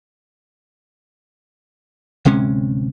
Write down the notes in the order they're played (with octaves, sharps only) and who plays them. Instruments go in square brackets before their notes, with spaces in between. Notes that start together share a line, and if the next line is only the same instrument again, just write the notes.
[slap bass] D1 C3 G#3 C#4